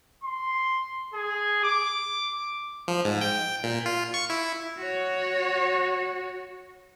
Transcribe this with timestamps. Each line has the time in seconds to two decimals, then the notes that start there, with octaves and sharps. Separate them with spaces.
0.24 C6
1.14 G#4
1.64 D6
2.88 F3
3.05 G#2
3.21 G5
3.64 A#2
3.86 F4
4.14 C#6
4.30 E4
4.78 F#4 C#5